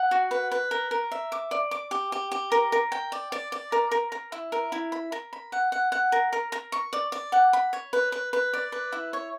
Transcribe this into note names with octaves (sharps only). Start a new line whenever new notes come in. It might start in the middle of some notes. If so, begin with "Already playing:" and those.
Already playing: F#5
F#4
B4
B4
A#4
A#4
E5
D6
D5
D6
G4
G4
G4
A#4
A#4
G5
D5
D5
D5
A#4
A#4
A#4
E4
A#4
E4
B5
A#4
B5
F#5
F#5
F#5
A#4
A#4
A#4
C#6
D5
D5
F#5
B5
C#5
B4
B4
B4
D5
B4
E4
C#5